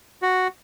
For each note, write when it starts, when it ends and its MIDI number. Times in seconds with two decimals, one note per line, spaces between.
0.22 0.48 66